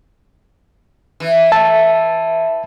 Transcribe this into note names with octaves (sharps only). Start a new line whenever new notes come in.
E3
E5 A5